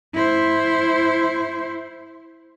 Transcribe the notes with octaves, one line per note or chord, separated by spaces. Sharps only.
E4 C5